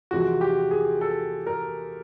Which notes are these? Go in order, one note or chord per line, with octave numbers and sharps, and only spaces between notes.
E2 C3 F3 G#3 C4 F#4
G4
G#4
A4
A#4